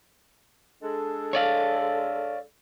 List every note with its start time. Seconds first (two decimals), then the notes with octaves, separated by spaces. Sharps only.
0.82 G#3 D4 A4
1.33 C#5 D5 F5